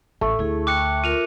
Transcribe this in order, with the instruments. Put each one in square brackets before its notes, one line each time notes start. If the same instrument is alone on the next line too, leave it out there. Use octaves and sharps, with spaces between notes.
[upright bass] A1 [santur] A3
[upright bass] D2 [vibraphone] E4 G#4
[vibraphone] G5 [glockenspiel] D6 F#6 C#7
[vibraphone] F4 A#4 [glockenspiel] D#7 F7